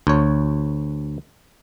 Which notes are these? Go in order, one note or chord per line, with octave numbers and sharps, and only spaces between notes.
D2 C#5